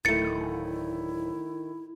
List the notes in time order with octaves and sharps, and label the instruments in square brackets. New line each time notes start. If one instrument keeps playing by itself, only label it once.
[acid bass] D1 [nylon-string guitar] D#3 A3 [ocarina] E4 [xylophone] A6 C#7